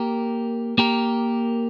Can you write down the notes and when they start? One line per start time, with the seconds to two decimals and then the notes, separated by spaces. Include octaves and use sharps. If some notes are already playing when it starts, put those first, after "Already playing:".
Already playing: A#3 G4 A#4
0.78 A#3 G4 A#4